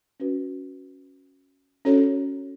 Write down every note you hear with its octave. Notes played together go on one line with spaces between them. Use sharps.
C#4 F#4 B4
C#4 F#4 A4 C#5